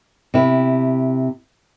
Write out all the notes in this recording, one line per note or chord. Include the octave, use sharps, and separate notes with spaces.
C3 E4